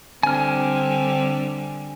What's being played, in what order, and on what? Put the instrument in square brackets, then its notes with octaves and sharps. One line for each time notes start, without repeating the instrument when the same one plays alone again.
[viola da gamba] D3 G3 [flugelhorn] C4 [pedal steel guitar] G#5 F6